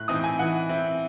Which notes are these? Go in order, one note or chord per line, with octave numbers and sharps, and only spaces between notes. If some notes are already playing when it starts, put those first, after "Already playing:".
Already playing: A2 F#6
E3 C4 D#4 D#6
G#5
E3 F#5
C4 E4